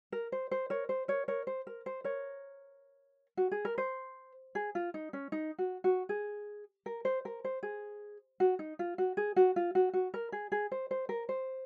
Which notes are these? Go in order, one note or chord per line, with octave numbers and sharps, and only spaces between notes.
A#4
C5
C5
A#4 C#5
C5
A#4 C#5
A#4 C#5
C5
A#4
C5
A#4 C#5
F#4
G#4
A#4
C5
G#4
F4
D#4
C#4
D#4
F#4
F#4
G#4
A#4
C5
A#4
C5
G#4
F#4
D#4
F4
F#4
G#4
F#4
F4
F#4
F#4
A#4
G#4
G#4
C5
C5
A#4
C5